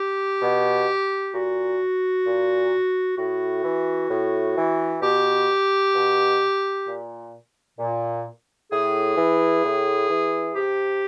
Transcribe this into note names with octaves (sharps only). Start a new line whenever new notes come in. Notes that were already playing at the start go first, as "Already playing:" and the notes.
Already playing: G4
B2
A#2 F#4
A#2
A2 F#4
E3
A2
E3
B2 G4
B2
A#2
A#2
A2 G#4
E3
A2
E3
C3 G4